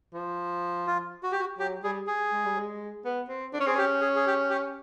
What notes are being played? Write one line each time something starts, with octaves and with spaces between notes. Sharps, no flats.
F3
F4
F#4
G4
F#4
F#3 G4
G3 G#4
G#4
G#3
G3
G#3
B3
C4
D4
C#4
C4 G#4
C#4 G4
G#4
G#4
G4
G4